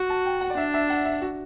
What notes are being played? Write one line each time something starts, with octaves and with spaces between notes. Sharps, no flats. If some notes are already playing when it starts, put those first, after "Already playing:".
Already playing: F#4
A5
G5
F#5
D5
D4 E5
E5
F#5
E5
F#4